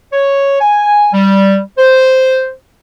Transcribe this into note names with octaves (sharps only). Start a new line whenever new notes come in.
C#5
G#5
G3
C5